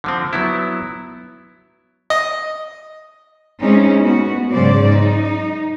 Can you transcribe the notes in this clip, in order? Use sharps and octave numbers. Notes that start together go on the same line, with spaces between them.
D3 F3 C4
F#3 B3 E4
D#5
G#3 C4 C#4 D#4 E4
B3 F#4
G#2 C#3 F#3 C5 D5
D#4